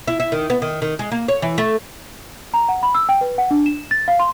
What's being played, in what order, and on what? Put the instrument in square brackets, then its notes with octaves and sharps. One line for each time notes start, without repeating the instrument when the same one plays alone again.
[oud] E4
E4
D#3
B3
D#3
D#3
G#3
A#3
C#5
E3
A3
[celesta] A#5
F#5
B5
E6
G5
B4
F#5
D4
E7
A6
F5
C6